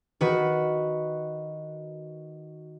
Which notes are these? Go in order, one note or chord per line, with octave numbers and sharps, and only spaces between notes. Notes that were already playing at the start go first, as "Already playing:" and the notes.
D#3 F#4 B4